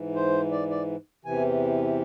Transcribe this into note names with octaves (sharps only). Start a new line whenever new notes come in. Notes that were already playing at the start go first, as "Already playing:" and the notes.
Already playing: G#2 E3
C5
D5
D5
E2 C3 E3 G#5